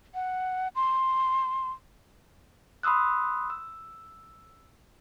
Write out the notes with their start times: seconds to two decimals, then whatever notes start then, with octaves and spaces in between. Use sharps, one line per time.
0.15 F#5
0.75 C6
2.83 B5 C6 D#6 E6 F#6
3.50 E6